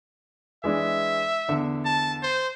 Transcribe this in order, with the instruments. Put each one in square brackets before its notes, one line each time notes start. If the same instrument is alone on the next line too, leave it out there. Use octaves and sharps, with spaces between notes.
[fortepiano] E3 G#3 D4 [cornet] E5
[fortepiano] E2 D3
[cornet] A5
C5